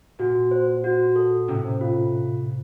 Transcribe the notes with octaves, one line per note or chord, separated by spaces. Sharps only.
A#2 F#4
C5
F#4
A4
A2 C3 C#4
F4